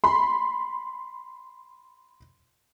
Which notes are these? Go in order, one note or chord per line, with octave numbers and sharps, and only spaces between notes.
B5 C6